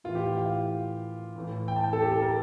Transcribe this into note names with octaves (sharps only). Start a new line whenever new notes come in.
A2 E3 F4
G4
F5
A2 E3
G5
A5
G5
A4
G4
A4
A#4